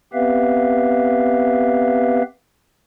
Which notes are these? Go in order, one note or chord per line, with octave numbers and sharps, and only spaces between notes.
B3 C4 G4 B4 E5 F5